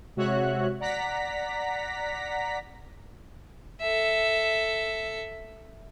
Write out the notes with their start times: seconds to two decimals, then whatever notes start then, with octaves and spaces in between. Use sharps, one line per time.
0.16 C3 G#3 F#4 C#5 E5 F#6
0.80 D5 F#5 A#5 A#6 B6
3.81 A4 E5